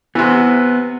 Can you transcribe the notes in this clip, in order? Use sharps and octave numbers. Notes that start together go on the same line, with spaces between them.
C3 E3 B3